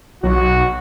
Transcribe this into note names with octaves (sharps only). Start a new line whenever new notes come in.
B1 F#3 F#4